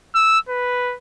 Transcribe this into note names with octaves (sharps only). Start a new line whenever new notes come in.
E6
B4